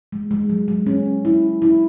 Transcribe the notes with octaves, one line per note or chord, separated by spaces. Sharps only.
G#3
G#3
F#3
G#3
C#4
E4
E4